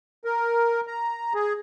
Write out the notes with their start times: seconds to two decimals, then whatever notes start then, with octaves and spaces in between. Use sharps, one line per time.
0.25 A#4
0.87 A#5
1.34 G#4